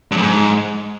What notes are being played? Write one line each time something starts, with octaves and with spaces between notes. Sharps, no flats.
G2
F2
G#2